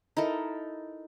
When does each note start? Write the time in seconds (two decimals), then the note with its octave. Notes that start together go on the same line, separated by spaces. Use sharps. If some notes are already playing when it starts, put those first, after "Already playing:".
0.17 D#4 E4 A4 A#4